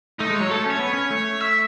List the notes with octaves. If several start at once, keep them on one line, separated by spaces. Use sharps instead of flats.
A3 D#4
G#3
C#5
F#3
A3 A4
C#4 C#5
B3
C#4
A3
E5